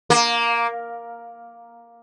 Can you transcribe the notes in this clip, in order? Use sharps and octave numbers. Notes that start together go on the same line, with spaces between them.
A#3